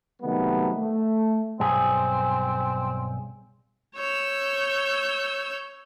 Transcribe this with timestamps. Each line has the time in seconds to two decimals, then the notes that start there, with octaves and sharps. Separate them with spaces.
0.22 C3 D#3 F#3 G3 A3 B3
0.77 A3
1.60 B1 G2 C4 G#4
3.96 C#5 E6 G6